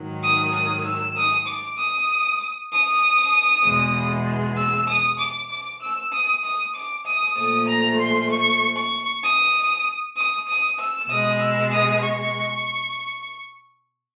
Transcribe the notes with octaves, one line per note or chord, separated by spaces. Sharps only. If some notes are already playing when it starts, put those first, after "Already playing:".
Already playing: G#2 D#3 F#3
D#6
D#6
E6
D#6
D6
D#6
D#6
E2 B2 G#3
E6
D#6
D6
D6
E6
D#6
D#6
D6
D#6
A#2 F3 A3 D#6
A#5
C6
C#6
C#6
D#6
D#6
D#6
E6
B2 G#3 D#6
E6
D#6
C#6